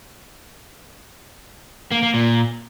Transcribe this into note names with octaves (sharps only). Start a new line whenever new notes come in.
A#3
A#3
A#2